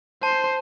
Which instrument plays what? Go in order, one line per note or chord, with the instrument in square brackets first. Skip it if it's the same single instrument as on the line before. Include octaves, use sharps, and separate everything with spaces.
[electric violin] C5 [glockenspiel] A5